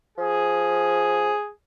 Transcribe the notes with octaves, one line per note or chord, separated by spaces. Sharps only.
F3 G#4